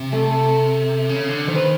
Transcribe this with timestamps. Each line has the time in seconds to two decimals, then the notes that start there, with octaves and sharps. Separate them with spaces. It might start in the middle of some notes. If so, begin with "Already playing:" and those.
Already playing: C3
0.12 A3 A4
1.09 C#3
1.28 D3
1.48 D#3 C5
1.55 B4